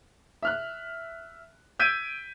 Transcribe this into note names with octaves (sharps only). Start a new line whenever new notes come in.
E5 F6 F#6
E6 G6 G#6 B6 D7 D#7